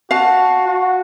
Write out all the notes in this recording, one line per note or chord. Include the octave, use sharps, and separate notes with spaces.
F#4 F5 A5
F#4